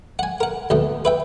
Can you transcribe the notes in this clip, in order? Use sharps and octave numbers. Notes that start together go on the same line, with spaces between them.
F#5 G#5
A#4 F#5
D2 B2 A3
B4 E5 G5